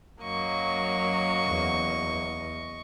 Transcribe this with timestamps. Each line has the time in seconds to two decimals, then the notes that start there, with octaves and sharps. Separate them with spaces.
0.23 F#2 F#3 A#3 D#5 C#6
1.47 E2